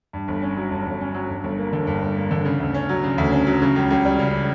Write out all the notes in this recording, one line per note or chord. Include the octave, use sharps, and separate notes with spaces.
G2
G1
C#4
F#3
G2
G1
C#4
F#3
G2
G1
A#3
D3
G2
G1
A#3
D3
C#3
D2
C#4
F#3
C#3
D2
C#4
F#3
C#3
C#2
C#2
G3
C#3